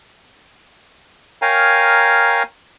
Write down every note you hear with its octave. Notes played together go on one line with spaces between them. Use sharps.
A#4 C#5 F5 G5 G#5 A#5